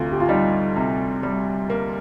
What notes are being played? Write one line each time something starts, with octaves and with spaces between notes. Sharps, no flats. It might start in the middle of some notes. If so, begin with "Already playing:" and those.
Already playing: D2 C3 F4
G4
F4
G3 D#4
C3
G3
A#3